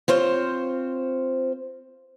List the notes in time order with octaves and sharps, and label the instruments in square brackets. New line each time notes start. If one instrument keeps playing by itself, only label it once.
[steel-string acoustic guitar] C4 F4 C5 C#5